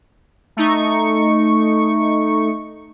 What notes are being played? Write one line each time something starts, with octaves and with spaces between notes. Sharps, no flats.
A3 D#4 C#6